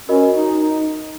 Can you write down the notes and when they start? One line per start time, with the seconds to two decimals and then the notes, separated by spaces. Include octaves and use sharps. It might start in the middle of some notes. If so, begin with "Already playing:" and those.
0.09 C#4 F#4 A#4 D#5
0.34 D#4
0.59 D#4